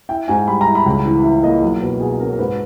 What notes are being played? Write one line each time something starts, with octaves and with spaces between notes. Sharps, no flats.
E4 G5
G#2 G#5
G3 B5
A#5
E4
B5
C#2
E3
E3 E5
A#3 D#5
B1
B2 B4
B2 G#4
C#4 A#4
A#4
G#2 B4